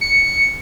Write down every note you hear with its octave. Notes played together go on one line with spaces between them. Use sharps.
C#7